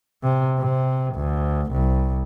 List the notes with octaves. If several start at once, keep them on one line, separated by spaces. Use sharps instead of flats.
C3
C3
D2
C2